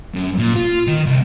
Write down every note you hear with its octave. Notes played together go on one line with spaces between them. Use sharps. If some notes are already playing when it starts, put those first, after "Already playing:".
F#2
A#2
F4
D#3
C2